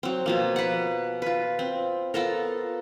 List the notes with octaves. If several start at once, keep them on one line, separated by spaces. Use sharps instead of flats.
F#3 C4
B2 F3 A#3
B4 F#5
F4 B4
C4
B3 F4 A4 A#4